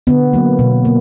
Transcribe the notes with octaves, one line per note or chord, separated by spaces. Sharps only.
D3 B3
F#3 A#3
B2
A#3